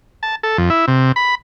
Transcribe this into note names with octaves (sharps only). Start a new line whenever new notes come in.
A5
A4
F2
E4
C3
B5